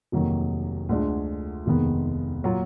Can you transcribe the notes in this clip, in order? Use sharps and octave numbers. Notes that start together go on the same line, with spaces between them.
F1 D#2 D#3 F#3 A#3
D2 D3 G#3 D4 F4
F1 D#2 D#3 G#3 B3
A#2 F#3 A#3 F4